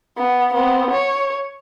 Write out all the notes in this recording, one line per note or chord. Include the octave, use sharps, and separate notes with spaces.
B3
B3 C4
C#5